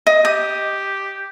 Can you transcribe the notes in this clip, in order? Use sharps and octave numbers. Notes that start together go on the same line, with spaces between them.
D#5
G4 D#6